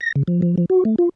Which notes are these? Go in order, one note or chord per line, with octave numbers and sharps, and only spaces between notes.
A#6
C#3
F3
F3
F3
F#4
A3
F4